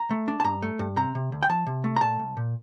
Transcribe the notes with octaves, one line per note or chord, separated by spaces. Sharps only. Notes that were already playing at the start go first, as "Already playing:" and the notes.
Already playing: A#5
A3
D4
A5
G2 A#5
A3
G2
C3 A#5
C3
D2
G5
F3 A5
C3
A3
A#5
A#2 A5
C2
A#2